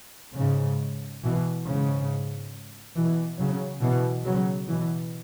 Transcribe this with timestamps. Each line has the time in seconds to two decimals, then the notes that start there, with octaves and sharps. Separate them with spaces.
0.36 G#2 C#3
1.23 B2 E3
1.66 G#2 C#3
2.95 B2 E3
3.38 C#3 F#3
3.81 B2 E3
4.24 C#3 F#3
4.68 B2 E3